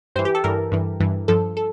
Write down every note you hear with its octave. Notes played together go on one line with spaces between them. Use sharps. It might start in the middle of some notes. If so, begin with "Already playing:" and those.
G2 E3 C5
G4
A4
G2 E3 A#4
G2 E3
G2 E3
G2 F3 A4
A4